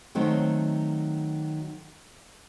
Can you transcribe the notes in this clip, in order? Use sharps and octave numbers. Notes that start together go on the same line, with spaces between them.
D#3 F#3 A3 C4